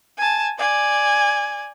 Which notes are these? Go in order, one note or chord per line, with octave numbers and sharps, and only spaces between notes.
G#5 A5
D5 G#5